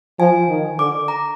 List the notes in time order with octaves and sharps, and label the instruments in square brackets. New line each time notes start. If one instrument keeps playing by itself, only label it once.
[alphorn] F3 [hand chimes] G#5
[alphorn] D#3
[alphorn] D3 [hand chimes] D6
[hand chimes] A#5